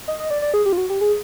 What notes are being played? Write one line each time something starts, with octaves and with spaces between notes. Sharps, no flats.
D#5
D#5
D5
D5
G#4
G4
F4
F#4
G4
G#4